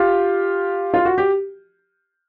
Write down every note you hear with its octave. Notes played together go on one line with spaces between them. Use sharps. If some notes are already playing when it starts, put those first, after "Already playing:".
Already playing: F4 G4
F4
F#4
G4